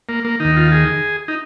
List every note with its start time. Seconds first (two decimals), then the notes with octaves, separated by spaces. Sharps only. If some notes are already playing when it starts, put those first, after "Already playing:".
0.09 A#3
0.25 A#3
0.40 D#2 D#3 D#4
0.57 F4
0.72 G#4
1.28 D#4